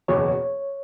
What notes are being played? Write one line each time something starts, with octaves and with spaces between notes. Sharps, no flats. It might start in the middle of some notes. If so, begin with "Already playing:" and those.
F#1 E2 B2 C#5